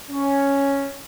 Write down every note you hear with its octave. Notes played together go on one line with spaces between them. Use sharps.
C#4